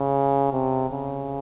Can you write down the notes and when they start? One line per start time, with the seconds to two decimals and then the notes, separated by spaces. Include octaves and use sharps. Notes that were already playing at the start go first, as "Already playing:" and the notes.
Already playing: C#3
0.52 C3
0.90 C#3